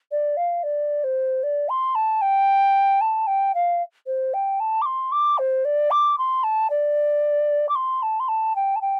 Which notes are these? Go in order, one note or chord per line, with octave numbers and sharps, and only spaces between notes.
D5
F5
D5
C5
D5
C6
A5
G5
A5
G5
F5
C5
G5
A5
D6
C6
D6
C5
D5
D6
C6
A5
D5
D6
C6
A5
C6
A5
G5
A5
G5